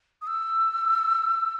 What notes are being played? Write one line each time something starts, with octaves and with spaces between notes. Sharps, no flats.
D#6
E6